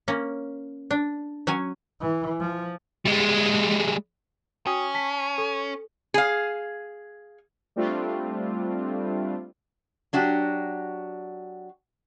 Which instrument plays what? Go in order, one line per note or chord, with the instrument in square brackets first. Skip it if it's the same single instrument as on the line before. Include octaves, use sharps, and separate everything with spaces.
[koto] A#3 C#4
D4
F#3 C#4 G#5
[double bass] E3
F3
[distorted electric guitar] G3 G#3
[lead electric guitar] C#4 [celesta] F#4 G5 D#6
[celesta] A5 B6
A4
[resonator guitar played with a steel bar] G#4 F5
[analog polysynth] G3 A3 C4 D4 F4
[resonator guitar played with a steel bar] F#3 D4 F#4 G4